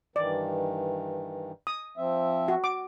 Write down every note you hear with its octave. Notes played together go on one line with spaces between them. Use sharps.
G2 D#3 E3 D5
D#6
F3 C4 E5
F#4
D6